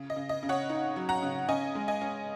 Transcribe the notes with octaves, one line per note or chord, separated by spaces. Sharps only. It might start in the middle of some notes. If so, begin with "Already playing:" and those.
Already playing: C#3
D#5
C#3
D#5
C#3
C#5 F#5
D#4
F#3
F#5 A#5
C#3
C#4 D#5 G#5
G#3
D#5 G#5
C#4